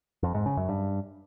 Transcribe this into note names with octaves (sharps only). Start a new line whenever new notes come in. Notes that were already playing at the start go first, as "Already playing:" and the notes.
F2
G#2
C#3
F#2
G2